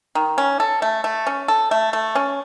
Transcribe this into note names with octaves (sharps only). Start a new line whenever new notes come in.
D#3
C#4
A4
A3
A3
C#4
A4
A3
A3
C#4